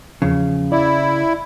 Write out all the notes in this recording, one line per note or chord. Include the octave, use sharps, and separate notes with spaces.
E2 C#3 F3
E4 D5